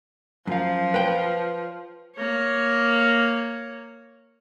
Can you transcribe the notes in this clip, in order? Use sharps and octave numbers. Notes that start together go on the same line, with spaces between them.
F#2 F3 F5
B4 C#5 G5
A#3 C#5